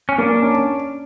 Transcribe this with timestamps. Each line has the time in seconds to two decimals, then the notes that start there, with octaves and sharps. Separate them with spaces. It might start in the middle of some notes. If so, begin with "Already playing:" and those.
0.09 C#4
0.18 A#3 D4
0.43 C#4